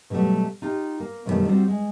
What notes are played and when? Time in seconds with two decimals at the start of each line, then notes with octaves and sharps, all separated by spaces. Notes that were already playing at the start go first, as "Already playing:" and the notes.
0.10 B2 D3 F#3 G3 A3
0.62 D#4 F4 G4
1.00 A#3
1.26 F#2 B2 D#3 F3 G3 A3
1.48 G3 C4 F4 F#4 C5
1.68 G#3